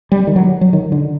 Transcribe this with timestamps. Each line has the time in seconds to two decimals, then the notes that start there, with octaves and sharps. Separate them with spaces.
0.12 G3
0.27 D#3
0.36 F#3
0.61 F#3
0.73 D#3
0.92 D3